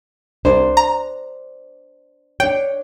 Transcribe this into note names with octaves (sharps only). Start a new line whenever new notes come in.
C2 D4 C5
A#5
D4 C#5 G5